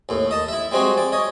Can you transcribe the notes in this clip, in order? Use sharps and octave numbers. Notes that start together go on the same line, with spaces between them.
D#2 A2
D#5 A5
E4 E5
G3 G#3 C4 F#4 G#4
D5
C#5 D#5